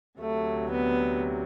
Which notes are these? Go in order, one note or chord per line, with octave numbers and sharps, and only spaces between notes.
D2 C3 F#3 A3
B3